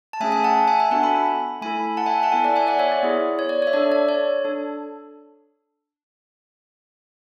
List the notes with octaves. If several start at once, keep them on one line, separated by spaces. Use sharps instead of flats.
A5
A3 C#4 G#4 E5 G#5
E5 G#5
F#5 A5
E5 G#5
E5 G#5
B3 D4 F#4 A4 F#5 A5
G#5 B5
A3 E4 A4 G#5 B5
F#5 A5
E5 G#5
F#5 A5
B3 E4 A4 E5 G#5
D5 F#5
E5 G#5
D5 F#5
C#5 E5
D5
B3 E4 G#4
C#5
D5
C#5
E5
D4 A4 D5
D5
C#5
D4 A4